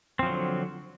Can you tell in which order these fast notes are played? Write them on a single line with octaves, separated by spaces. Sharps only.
C4 F3 F#3 D3